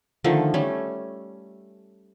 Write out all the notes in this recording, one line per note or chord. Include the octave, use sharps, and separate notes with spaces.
D3 D#3 F3 A3
G3 A3 C#4